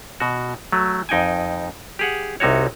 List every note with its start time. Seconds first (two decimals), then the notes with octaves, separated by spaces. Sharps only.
0.20 B2 F#4
0.72 F#3 A3
1.09 F2 D#4 G5 G#5
1.99 G4 G#4 F#5
2.40 C2 C3 D#4 F#4 C#5